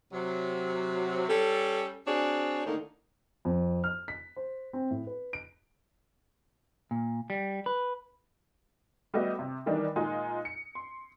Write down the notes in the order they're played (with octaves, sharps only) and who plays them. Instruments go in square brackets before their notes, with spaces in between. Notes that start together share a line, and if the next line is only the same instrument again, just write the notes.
[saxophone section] C3 F#3
G3 C#4 A4
C4 D4 F#4 G#4 C#5
A2 D3 D#3 A#3 D#4
[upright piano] F2
F6
B6
C5
C4
A2
B4
D7
[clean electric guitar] A#2
G3
B4
[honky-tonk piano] G3 A3 B3 F#4 B4 D#5
C3
D#3 E3 G3 D4 D#4
A#2 G#3 D#4 F4
C#7
C6